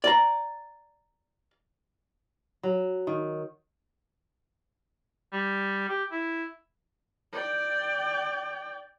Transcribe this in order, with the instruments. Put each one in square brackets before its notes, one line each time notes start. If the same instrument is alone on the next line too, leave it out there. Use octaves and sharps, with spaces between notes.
[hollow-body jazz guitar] D5 A#5
[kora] F#3
D#3
[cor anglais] G3
G4
E4
[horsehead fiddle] D5 G5